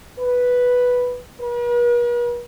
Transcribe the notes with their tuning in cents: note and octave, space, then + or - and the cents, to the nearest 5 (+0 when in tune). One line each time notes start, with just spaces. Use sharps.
B4 -5
B4 -45